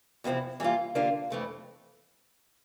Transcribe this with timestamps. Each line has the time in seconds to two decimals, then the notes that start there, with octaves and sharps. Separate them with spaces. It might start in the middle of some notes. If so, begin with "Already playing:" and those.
0.24 E2 C3 F3 C4 E4
0.60 E3 G3 A#3 F4
0.95 D3 G3 A#3 D4 F4
1.30 F2 E3 A3 E4